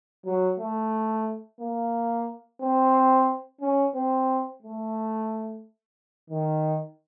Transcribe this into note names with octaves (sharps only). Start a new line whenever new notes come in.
F#3
A3
A#3
C4
C#4
C4
A3
D#3